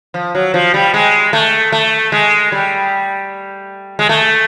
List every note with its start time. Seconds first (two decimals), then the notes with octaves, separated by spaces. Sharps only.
0.14 F3
0.35 F#3
0.54 F3
0.74 G3
0.94 G#3
1.33 A3
1.72 A3
2.12 G#3
2.52 G3
3.99 G#3
4.09 A3